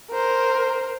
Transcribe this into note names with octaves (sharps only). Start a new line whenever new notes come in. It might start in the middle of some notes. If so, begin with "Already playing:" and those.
A#4 C5